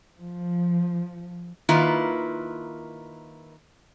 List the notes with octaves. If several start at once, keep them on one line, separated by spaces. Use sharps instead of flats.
F3
D#3 A#3 E4 F4 B4